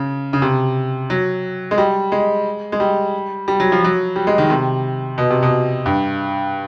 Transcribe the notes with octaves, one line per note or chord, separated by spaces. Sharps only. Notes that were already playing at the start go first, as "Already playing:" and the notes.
Already playing: C#3
C#3
C3
F#3
G#3
G3
G#3
G#3
G3
G3
F#3
F3
F#3
G3
G#3
D#3
C3
B2
C3
B2
G2